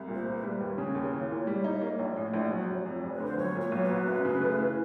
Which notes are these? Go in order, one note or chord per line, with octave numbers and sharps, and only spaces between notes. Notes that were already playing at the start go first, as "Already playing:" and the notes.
Already playing: C2
A#2
C5
A#3
B4
G3
D#2 C#5
C#3
D#2
E3
A#2
G3
D#4
A#3
A#1
A2
A#1
F#3
F1
F2
F1
B4
D3
C5
B1 C#5
A#2
C#5
B1
F#3 B4
F#2
C#3
A3
E3